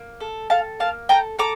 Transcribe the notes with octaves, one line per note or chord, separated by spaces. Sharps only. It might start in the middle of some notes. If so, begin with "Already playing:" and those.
Already playing: A#3
A4
A4 F5 A5
A#3 F5 A5
A4 G5 A#5
A4 A#5 D6